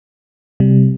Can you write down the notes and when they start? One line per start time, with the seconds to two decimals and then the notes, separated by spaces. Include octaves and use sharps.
0.60 C3 G3